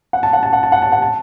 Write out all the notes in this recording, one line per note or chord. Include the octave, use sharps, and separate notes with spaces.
F#5
A5
F#5
A5
F#5
A5
F#5
A5
F#5
A5